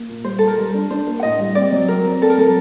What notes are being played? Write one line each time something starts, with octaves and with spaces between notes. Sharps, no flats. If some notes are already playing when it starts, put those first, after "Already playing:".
Already playing: A#3
A#2
G3 C5
A4
A#3
A#4
G3
D4
D4 C5
A#3
F#5
A2 D#5
G3
C4 D5
F#3
C4 A#4
C4
C4 A4
A#4
F#3 A4